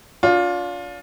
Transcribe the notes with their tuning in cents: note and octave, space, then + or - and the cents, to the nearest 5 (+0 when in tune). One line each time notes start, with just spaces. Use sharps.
D4 -35 F4 +20